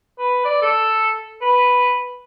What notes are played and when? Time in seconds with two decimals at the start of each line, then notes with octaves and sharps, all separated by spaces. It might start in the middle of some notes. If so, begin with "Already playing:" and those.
0.18 B4
0.45 D5
0.62 A4
1.41 B4